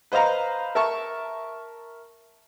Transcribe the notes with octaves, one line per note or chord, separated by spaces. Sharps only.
B4 C5 D#5 F5 A#5
A#4 E5 A5 C#6